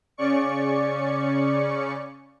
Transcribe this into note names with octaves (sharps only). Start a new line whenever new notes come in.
C#3 C#4 D5 C#6 C#7